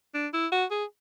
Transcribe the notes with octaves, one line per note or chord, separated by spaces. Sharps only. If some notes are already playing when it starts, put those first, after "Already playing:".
D4
E4
F#4
G#4